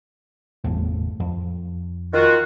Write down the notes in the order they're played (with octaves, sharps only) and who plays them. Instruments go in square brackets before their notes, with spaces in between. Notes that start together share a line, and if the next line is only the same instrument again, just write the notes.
[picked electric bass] G1 E2 A2
F2
[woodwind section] D#3 F4 F#4